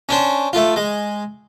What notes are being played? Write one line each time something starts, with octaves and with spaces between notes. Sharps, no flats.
C#4 D4 C5
A3 F4
G#3